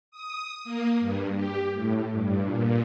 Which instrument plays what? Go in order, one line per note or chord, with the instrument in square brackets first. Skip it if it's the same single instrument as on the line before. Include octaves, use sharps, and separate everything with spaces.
[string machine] D#6
A#3
G2
G4
A2
G2
A#2